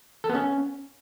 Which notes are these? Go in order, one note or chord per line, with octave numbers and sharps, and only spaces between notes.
A4
B3
C#4